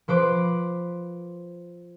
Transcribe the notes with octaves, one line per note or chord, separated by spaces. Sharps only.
F3 B4 C5 D6